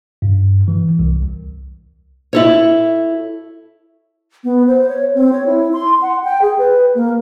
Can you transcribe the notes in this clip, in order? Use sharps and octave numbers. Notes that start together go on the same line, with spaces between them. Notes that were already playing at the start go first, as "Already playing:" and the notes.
G2
E3
C2
E4 A4 C#5
B3
C5
C#5
C4
C#5
E4
C6
F#5
G5
G#4
B4
A#3